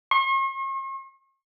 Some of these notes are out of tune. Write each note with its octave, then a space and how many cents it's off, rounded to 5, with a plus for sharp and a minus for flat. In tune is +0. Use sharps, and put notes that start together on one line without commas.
C#6 -45